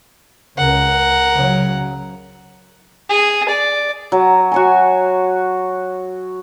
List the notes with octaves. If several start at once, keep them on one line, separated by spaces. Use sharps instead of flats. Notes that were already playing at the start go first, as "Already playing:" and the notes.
C#2 C#3 A#4 F#5
C#3 F#3
G#4
D5
F#3
F#4 C#5 G#5